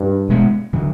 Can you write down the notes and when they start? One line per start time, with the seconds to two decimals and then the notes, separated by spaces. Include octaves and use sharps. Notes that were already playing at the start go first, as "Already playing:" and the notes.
Already playing: G2
0.29 B2 G#3 B3
0.73 D3 F#3